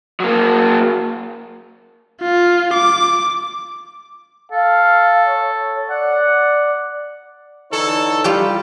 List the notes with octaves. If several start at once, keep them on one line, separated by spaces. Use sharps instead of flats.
F#3 A#3
F4
D6
A4 F5
C#5
D5 F#5
D3 E3 D#4 A4 C#5
G3 F4 G4 G5